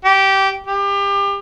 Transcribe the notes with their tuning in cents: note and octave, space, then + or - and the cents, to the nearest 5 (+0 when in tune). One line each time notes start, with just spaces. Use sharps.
G4 -15
G4 +30